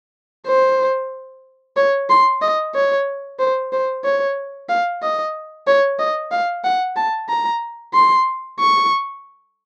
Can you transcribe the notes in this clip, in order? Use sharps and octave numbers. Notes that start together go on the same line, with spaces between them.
C5
C#5
C6
D#5
C#5
C5
C5
C#5
F5
D#5
C#5
D#5
F5
F#5
A5
A#5
C6
C#6